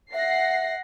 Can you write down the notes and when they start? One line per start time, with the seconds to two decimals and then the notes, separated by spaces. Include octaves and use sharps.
0.14 E5 F#5 A#6 C7